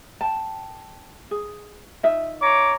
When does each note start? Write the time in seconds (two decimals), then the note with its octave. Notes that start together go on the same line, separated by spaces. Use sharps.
0.21 G5 A5
1.31 G#4
2.03 D#4 F4 E5
2.42 C#5 A#5 D6